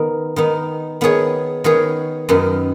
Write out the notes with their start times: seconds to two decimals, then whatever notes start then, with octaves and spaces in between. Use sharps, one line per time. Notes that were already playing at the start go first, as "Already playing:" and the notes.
Already playing: D#3 B3 D#4
0.36 D#3 B3 D#4
1.01 D#3 B3 G#4 C#5
1.64 D#3 B3 G#4 C#5
2.29 F#2 D#3 B3